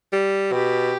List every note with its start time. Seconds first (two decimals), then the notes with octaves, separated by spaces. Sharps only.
0.13 G3
0.52 B2 G4